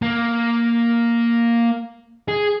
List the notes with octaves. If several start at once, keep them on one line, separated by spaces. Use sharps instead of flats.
A#3
G#4